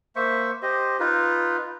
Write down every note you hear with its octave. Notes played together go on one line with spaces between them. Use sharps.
A#3 C5 E5 C#6
G4 C5 D#5
D#4 F4 B4